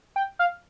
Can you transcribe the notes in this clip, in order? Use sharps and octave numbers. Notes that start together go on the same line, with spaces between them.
G5
F5